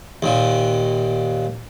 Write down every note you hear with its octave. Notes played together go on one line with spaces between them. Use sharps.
D#2 A#2